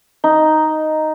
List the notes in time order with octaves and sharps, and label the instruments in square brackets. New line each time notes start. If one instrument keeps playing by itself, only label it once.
[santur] D#4